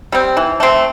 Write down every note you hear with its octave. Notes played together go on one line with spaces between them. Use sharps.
G3 C4
E3
A3 C4